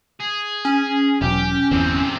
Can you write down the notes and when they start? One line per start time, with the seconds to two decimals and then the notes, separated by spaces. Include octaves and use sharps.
0.20 G#4
0.65 C#4
1.21 E1 B1 G4
1.71 G1 E2 D3 C4